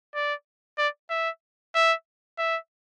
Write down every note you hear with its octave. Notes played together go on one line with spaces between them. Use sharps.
D5
D5
E5
E5
E5